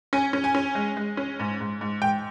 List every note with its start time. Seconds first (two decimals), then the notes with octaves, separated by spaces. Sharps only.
0.13 C#4 G#5
0.33 C#4
0.44 G#5
0.55 C#4
0.75 G#3
0.97 G#3
1.17 C#4
1.39 G#2
1.61 G#2
1.81 G#2
2.02 G#2 G5